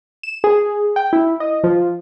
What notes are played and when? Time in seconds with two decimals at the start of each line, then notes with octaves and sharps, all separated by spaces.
0.23 E7
0.44 G#4
0.96 G5
1.13 E4
1.40 D#5
1.64 F3